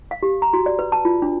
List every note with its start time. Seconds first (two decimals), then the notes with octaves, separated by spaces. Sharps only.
0.11 F5
0.23 G4
0.42 A#5
0.53 F#4
0.66 D5
0.79 B4
0.92 A5
1.05 F4
1.22 D4